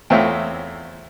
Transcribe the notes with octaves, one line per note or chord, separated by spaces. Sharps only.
E2 A3 C4 F4 C#5 E5